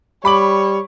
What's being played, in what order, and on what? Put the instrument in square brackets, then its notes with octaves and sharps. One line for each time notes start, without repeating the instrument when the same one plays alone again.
[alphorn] G3 [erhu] C#5 [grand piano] B5 D6 F#7